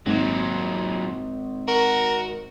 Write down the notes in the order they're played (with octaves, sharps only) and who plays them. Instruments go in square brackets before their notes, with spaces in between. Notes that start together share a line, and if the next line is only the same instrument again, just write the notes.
[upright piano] G#1 [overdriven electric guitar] A#2 F#3
[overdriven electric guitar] F#4 [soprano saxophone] A#4